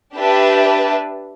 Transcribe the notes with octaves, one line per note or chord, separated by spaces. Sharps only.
D4 G4 B4 E5 A5